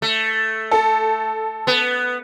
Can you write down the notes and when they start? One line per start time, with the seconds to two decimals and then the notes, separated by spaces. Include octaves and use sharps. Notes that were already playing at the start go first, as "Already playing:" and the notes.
0.02 A3
0.71 A4
1.67 B3